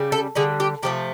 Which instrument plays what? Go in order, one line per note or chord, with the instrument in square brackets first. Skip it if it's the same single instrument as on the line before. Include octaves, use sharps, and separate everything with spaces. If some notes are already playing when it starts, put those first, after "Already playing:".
Already playing: [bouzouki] C#3 G3
A4
D3 G3 G#4
G4
C3 F3 A3 G4